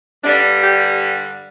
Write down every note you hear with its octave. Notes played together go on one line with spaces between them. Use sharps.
G2 D3 G3 D4
G4